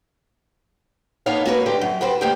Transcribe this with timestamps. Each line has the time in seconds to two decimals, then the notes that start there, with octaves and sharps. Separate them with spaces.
1.26 A#3 B3 D#4 A4 C#5 F5
1.46 A#3 F#4 B4
1.66 D3 G4 C5
1.81 F#2
2.01 F#4 G4 B4 C5
2.21 D2 A#3 G4 G5